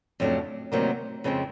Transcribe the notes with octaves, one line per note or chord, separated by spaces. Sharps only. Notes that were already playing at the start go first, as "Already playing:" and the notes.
F2 C#3 F#3 A3 D4
D2 C3 D#3 F#3 A#3
F2 C#3 F3 G#3 C4